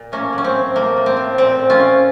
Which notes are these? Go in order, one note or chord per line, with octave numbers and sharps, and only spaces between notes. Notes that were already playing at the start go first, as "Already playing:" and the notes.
Already playing: A#2
A2 A#3 C#4
F#3
C#4
C4
A2
A2 A#3
A2
C4
A2
A#2 C4
A#2
C#4 F4
A#2